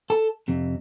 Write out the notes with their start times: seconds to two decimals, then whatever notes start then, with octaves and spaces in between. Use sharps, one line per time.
0.10 A4 A5
0.48 F2 C3